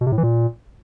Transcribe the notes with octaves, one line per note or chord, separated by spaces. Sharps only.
B2
C3
A2
E3
A#2